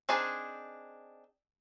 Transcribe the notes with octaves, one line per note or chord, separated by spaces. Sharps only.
C4 D4 D#4 G#4